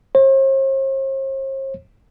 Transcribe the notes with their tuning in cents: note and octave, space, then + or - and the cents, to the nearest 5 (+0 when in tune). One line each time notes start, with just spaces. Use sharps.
C5 +45